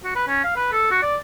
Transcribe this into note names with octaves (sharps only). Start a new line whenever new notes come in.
F#4
B4
C#4
F5
B4
A4
F#4
D5